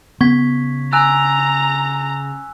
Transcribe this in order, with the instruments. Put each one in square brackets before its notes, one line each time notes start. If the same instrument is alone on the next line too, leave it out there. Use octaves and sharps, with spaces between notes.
[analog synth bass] C#3 [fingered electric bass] B3 C4 [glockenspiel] C#6 G#6 B6
[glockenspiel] G#5 E6 F#6 [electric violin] A#5